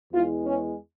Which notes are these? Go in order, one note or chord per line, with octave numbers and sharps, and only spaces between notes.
E2 E3 G#3 F4
C#4